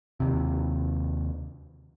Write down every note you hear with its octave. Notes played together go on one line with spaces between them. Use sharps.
D#2 C3